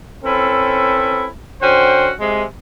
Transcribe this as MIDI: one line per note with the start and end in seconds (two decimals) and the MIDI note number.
0.25 1.27 60
0.25 1.27 61
0.25 1.27 64
0.25 1.27 69
0.25 1.27 71
1.62 2.11 50
1.62 2.11 61
1.62 2.11 66
1.62 2.11 72
1.62 2.11 79
2.20 2.44 48
2.20 2.44 56